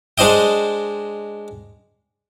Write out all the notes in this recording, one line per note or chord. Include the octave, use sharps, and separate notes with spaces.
G#3 D4 C5 D#5 G5